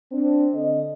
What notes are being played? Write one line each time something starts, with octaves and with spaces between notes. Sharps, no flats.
C4 D4
D3 A4 D#5